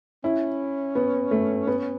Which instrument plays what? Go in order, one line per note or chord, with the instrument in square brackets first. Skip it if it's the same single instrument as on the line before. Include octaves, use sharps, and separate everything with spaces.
[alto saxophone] C#4 [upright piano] E4
[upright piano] B3
A3
B3